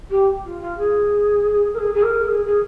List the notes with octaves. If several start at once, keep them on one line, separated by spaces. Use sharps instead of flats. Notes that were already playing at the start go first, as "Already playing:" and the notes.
G4
F4
F4
G#4
A#4
G#4
G#4
A#4
G#4
G#4